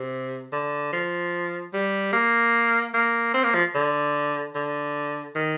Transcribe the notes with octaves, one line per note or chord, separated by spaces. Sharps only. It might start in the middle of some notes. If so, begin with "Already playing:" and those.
Already playing: C3
D3
F3
G3
A#3
A#3
C4
A#3
F3
D3
D3
D#3